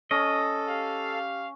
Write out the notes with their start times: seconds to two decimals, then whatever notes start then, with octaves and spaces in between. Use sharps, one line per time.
0.11 C#4 A4 D#5
0.68 G4 F5